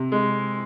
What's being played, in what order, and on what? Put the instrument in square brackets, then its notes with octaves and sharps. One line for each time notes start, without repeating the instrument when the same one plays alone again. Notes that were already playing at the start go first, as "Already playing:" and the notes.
Already playing: [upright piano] C3
G#3